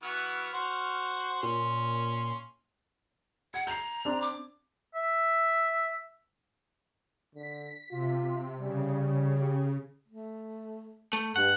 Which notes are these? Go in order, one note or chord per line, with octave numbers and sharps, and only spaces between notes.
E3 B3 F#4 F6
F#4 C5
A#2 C#4 C6
F#5 G#6
A#5 G6 C7
C4 D4
D6
E5
D3 B6
C3 F4
C#3 G3
G4
A3
A3
G2 F#5